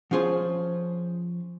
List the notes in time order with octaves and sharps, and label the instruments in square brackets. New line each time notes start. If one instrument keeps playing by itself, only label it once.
[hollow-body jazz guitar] F3 C#4 F4 G#4 C5